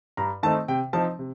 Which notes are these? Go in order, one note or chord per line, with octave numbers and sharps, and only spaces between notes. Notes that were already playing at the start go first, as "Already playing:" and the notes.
G2 A#5
D#3 A3 C4 D#4 A5
C3 G5
F3 C4 D#4 A5
C3